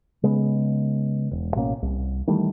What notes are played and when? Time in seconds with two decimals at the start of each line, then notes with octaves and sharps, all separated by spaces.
0.23 C#3 G#3 B3
1.31 E1
1.55 A1 B2 A#3 C#4
1.82 C2
2.27 D#3 E3 G3 A3